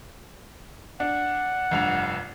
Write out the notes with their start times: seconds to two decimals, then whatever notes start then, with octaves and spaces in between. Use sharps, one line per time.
1.00 D4 F#5
1.71 F1 G2 F7